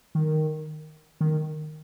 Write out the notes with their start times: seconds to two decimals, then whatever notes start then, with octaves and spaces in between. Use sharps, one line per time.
0.15 D#3
1.20 D#3